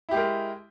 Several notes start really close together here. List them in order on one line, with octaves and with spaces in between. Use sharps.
E4 G4 G#3 A#4